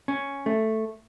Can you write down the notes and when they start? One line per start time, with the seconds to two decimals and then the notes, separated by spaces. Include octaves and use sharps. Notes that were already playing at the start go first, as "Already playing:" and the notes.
0.08 C#4
0.46 A3